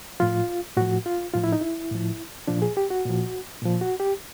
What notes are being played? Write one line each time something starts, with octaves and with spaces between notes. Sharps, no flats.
A2 F3 F4
A2 F3 F#4
F4
A2 F3 F4
E4
D#4
E4
A2 F3
A#2 F3 D4
G#4
G4
F#4
A#2 F3
A#2 F3
F#4
G4